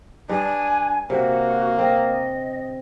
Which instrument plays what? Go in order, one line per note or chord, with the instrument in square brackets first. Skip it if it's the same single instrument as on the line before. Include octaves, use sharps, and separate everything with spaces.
[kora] G2 [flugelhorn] D4 [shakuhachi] G#5
[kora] C3 [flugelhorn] A#3 [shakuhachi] F#4
[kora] C4 [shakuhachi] D#5